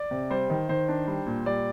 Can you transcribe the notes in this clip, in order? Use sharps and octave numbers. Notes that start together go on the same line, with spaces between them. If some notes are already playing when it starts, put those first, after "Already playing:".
Already playing: D5
C3
G3 C5
D#3
D#3 C5
D4
G3
A#2
G3 D5